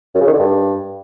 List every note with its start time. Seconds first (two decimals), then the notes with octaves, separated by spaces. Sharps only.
0.15 F#2
0.21 C#3
0.27 D#3
0.33 D3
0.39 G2